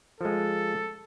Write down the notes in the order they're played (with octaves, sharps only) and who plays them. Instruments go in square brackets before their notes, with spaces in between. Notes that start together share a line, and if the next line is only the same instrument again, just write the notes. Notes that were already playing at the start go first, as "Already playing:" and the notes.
[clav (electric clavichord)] F3 G#3 [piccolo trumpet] A4